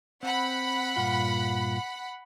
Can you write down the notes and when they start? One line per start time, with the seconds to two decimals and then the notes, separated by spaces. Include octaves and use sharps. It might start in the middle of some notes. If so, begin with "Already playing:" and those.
0.23 C4 F#5 B5
0.96 G2 A#2 F4